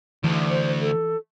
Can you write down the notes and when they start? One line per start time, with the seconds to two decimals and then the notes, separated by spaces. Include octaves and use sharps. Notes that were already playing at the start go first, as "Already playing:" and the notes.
0.24 D2 E3
0.49 C5
0.81 A4